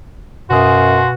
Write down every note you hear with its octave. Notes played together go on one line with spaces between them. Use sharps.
F#2 B2 F#4 F5 G#5 C6 D#6